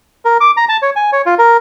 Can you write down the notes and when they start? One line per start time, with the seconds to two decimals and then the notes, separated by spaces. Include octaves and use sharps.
0.25 A#4
0.41 D6
0.57 A#5
0.69 A5
0.82 C#5
0.96 G#5
1.12 C#5
1.26 F4
1.38 A#4